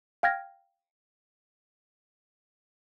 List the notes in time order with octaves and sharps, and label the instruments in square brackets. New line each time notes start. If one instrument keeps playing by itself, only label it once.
[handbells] F5 G5 F6 G#6 A#6